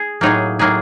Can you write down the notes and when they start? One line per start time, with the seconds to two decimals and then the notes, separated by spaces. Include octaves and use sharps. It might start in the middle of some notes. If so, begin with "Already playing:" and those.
Already playing: G#4
0.21 A2 F#3 A#3 D#4 G#4
0.59 A2 F#3 A#3 D#4 G#4